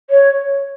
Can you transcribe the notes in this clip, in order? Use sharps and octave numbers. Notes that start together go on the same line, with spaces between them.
C#5